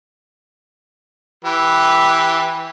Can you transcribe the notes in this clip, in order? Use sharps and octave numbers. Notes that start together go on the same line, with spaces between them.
E3 G4 B4